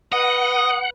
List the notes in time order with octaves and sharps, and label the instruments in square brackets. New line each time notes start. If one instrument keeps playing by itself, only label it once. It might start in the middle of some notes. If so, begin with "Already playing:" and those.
[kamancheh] B4 [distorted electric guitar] D#5 [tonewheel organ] F#5 [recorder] D#6